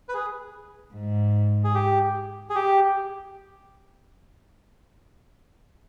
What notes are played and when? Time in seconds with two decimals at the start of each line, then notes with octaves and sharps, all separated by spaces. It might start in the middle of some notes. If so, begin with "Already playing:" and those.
0.09 B4
0.14 G#4
0.94 G#2
1.64 G#4
1.75 G4
2.50 G#4
2.56 G4